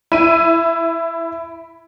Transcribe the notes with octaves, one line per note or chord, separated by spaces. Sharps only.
E4 D#7